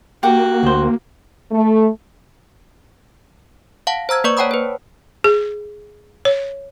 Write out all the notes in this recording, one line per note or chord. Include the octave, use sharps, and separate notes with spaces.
A#3 F#4 G4 F#5
D2 C5
A3
F5 F#5 A5
C5 A#5 E6 G#6
A#3 B4 D5 C#6
C#5 F#5 G5 A5 B5 D#6
B4 C5
G#4
C#5